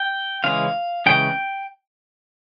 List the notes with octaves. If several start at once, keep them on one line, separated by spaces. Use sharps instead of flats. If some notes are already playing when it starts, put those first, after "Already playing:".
Already playing: G5
C#3 E3 G#3 C#4 F5
C#3 E3 G#3 C#4 G5